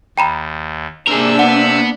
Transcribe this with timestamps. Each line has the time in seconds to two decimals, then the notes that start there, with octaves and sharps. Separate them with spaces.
0.17 D#2 G5 A#5 B5
1.07 C3 A#3 D4 G#4 A#4 E6
1.39 B3 F#5